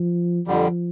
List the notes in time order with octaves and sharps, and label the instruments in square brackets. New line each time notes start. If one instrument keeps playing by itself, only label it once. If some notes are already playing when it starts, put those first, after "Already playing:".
Already playing: [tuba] F3
[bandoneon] F2 D3 G3 [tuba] F3